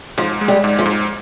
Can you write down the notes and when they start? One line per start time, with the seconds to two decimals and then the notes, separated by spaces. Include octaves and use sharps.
0.17 G#2 F3
0.41 G#3
0.48 G3
0.64 G#2
0.79 F3
0.86 G#2